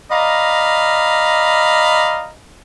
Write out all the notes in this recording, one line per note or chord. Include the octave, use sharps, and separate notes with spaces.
D5 D#5 F5 A#5 B5